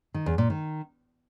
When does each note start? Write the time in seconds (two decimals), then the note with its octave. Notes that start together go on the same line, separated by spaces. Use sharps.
0.14 D#3
0.26 E2
0.38 A#2
0.50 D#3